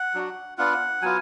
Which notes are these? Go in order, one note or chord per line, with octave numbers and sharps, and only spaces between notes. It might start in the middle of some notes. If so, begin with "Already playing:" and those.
Already playing: F#5
F#3 D4 F#4
B3 D4 F4 F#5
F#3 B3 F4 G#5